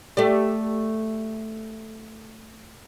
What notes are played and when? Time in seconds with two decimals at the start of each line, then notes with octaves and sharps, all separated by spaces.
0.17 A3 G4 D5